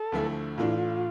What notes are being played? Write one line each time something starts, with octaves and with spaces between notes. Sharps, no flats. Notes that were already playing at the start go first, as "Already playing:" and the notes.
Already playing: A4
D2 D3 F3 A3 E4
A2 E3 A3 D4 F4